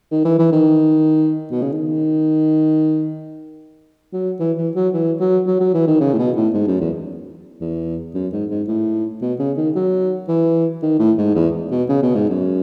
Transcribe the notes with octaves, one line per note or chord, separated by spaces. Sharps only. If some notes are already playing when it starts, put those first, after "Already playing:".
D#3
E3
E3
D#3
B2
C#3
D#3
F#3
E3
E3
F#3
E3
F#3
F#3
F#3
E3
D#3
C#3
A2
B2
A2
G#2
F#2
E2
E2
F#2
G#2
G#2
A2
B2
C#3
D#3
F#3
E3
D#3
A2
G#2
E2
B2
C#3
B2
G#2
F#2